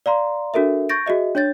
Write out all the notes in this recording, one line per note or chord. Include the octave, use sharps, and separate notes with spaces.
D5 F5 A#5 C6
D4 F#4 A4 A#4 E5
C#6 G6 A6 A#6 D7
F#4 G#4 D#5 E5
D4 C#5 G6 A6